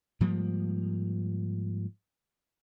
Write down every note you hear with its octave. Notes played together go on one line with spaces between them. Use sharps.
G#2 F3 G3 A#3